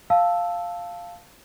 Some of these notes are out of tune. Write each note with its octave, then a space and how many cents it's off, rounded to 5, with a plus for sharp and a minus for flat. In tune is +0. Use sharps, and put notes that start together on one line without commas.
F5 +0 A5 +0 E6 +0